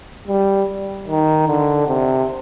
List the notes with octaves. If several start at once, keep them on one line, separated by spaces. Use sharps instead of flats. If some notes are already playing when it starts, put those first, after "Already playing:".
G3
D#3
D3
C3